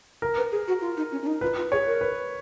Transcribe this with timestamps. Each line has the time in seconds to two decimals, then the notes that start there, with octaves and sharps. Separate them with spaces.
0.22 A#4
0.37 B4
0.52 G#4
0.68 F#4
0.82 F4
0.97 D#4
1.12 C#4
1.22 C#4
1.27 D#4
1.41 F4 B4
1.57 F4
1.72 G#4 C#5
1.86 A#4
2.01 B4